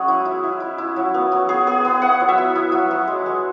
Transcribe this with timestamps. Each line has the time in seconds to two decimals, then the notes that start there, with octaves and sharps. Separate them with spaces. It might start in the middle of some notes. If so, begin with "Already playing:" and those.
Already playing: F#3 G#3 C#4 F#4 G#4 E5
0.08 E4
0.25 E4
0.43 E4
0.60 E4
0.78 E4
0.96 F#3
1.14 B3
1.32 F#3
1.49 B3 G#4
1.67 B3 G#4
1.85 B3
2.02 E4 F#5
2.20 F#3
2.29 E5
2.38 E4
2.55 E4
2.72 F#3
2.91 F#3
3.07 G#3
3.26 G#3